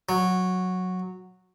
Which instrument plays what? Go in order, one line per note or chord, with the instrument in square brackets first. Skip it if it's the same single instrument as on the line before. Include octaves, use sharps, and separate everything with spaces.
[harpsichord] F#3